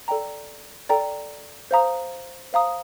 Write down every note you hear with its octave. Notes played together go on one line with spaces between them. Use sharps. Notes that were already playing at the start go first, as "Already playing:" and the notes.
A4 D5 G5 A#5
A4 D5 G5 A#5
C5 F5 A#5 D#6
C5 F5 A#5 D#6